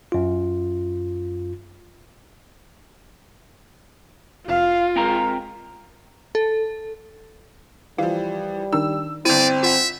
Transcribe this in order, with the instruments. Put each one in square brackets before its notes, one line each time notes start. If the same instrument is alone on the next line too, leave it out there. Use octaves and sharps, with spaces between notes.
[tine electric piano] F#2 F4
[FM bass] F1 [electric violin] F4 [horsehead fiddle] F5
[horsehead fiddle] G#3 A#4 [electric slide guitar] C4 G5 A#5
[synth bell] A4
[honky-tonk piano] E3 F3 [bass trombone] G3 [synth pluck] F5
[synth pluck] D#3 D4 D#4 [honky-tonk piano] E6
[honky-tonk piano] G1 D#7 [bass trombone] C4 [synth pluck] E4 [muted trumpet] D5
[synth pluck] F4 F#5 [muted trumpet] E5